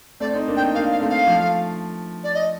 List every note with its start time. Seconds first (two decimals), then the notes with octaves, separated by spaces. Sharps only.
0.20 A3 C4 D5
0.34 C4 D#4
0.48 A#3 D4
0.57 G5
0.60 C4 D#4
0.74 A#3 D4 F5
0.92 F5
1.01 A3 C4
1.10 F5
1.27 F3 A3
2.24 D5
2.35 D#5